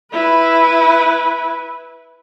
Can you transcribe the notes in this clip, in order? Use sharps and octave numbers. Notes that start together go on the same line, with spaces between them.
E4 B4